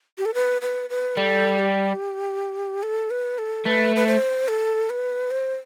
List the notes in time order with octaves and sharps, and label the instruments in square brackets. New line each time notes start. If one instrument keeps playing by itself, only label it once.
[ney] G4
A4
B4
B4
B4
[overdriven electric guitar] G3 [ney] A4
[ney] G4
A4
B4
A4
[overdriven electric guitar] A3 [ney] B4
[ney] B4
C5
A4
B4
C5